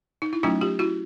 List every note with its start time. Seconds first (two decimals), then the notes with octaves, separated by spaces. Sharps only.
0.22 D#4
0.33 E4
0.43 F#3 A3 C#4 D#4 F4
0.61 F4 G4
0.79 E4 F#4